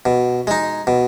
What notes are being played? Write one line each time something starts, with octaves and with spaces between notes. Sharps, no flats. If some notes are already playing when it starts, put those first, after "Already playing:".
B2
G#3 D#4
B2